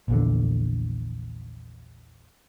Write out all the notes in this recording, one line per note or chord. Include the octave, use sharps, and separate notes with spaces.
A#1 E2 D3